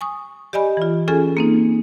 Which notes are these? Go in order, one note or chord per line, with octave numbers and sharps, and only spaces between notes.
G#5 C#6 D#6
G4 D5 D#5 G#5 B5
E3 F4
C#4 F4 G#4 A4 G#5
A#3 C4 D#4